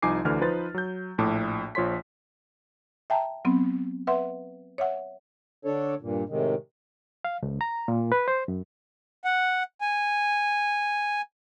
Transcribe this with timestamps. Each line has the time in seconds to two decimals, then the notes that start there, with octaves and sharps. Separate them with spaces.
0.02 C2 F3 D#4 G#5 D6 C7
0.25 D2 D3 E3 D4 F6
0.41 F3 D#4 B4 C5 A6
0.74 F#3 G6
1.18 A#1 A2 A5 D6
1.75 A#1 F3 C#5 C6 B6
3.10 E5 G5 A5 A#5
3.45 F#3 B3 C4
4.07 B4 E5 F#5 C6
4.78 C#5 E5 F#5
5.65 D3 D4 A4 C#5
6.01 G2 A#2
6.29 A2 C3 D#3 G#3
7.25 F5
7.43 C#2
7.61 A#5
7.88 A#2
8.12 B4
8.28 C5
8.48 F#2
9.24 F#5
9.81 G#5